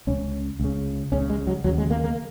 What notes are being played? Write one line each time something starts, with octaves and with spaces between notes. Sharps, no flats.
C#2 C#3 C#4
C#2 C#3
C#2 C#3 C#4
G#3
F#3
D#2 C#3 F#3
G#3
A#3
A#3